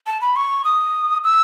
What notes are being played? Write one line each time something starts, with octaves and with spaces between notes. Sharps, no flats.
A5
B5
C#6
D#6
E6